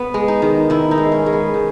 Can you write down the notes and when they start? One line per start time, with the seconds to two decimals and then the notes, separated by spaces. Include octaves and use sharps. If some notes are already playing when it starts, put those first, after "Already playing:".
Already playing: B3
0.14 G#3
0.28 D#4
0.42 D#3
0.70 D#3 E4
0.91 D#4
0.98 G#3
1.12 C#4
1.26 G#3
1.33 B3
1.54 D#3